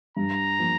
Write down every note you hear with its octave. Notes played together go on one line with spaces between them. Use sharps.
G2 A#5
F3 A#3